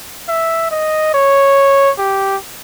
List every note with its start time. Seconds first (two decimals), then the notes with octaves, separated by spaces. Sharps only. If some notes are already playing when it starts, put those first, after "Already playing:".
0.28 E5
0.71 D#5
1.14 C#5
1.98 G4